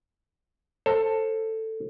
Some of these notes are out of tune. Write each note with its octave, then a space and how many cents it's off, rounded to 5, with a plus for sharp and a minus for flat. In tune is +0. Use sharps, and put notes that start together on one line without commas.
A4 +10 C5 +30 A#5 +0